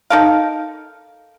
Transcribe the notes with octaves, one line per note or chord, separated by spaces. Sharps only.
D#4 A4 A#4 F5